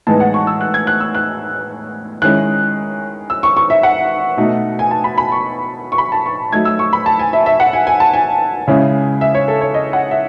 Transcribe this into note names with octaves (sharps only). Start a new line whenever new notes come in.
A2 E3 G#3 B3 D#4 A5
F#5
C#6
E6
F#6
G#6
F#6
E6
F#6
D#3 G#3 C#4 E4 F#6
E6
C#6
C#6
E5
F#5
B2 A3 D#4
G#5
A5
B5
B5
C#6
C#6
B5
A5
C#6
F#3 A3 D#4 G#6
E6
C#6
B5
A5
G#5
E5
E5
F#5
G#5
G#5
A5
G#5
C#3 G#3 C#4 E4
E5
C#5
A4
C#5
D#5
F#5
E5